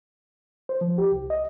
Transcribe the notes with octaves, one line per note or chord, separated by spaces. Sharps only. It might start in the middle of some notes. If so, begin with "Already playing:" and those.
C5
F3
G4
C2
D#5